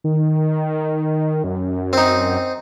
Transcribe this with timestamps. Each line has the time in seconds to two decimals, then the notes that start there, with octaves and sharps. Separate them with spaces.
0.04 D#3
1.44 F#2
1.93 C4 D#4